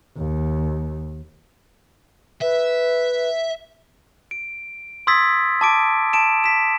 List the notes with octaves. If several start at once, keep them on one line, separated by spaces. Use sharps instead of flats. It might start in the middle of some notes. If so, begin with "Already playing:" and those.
D#2
B4 E5
D7
C6 D#6 E6 G#6 A6 B6
A5 D6 D7
A5 D7 E7
B6 E7